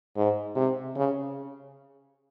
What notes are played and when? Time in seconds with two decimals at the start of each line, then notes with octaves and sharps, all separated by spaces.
0.16 G#2
0.55 C3
0.96 C#3